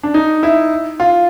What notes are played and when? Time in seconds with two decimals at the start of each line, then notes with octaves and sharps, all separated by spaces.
0.03 D4
0.14 D#4
0.43 E4
1.00 F4